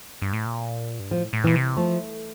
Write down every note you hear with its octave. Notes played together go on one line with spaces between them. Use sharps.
G2
A2
A#2
G2
A2 F3
A2
A#2 E3
C3
F3 A3